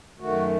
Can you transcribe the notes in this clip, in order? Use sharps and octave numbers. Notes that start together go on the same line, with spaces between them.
F#2 D#3 A3 F#4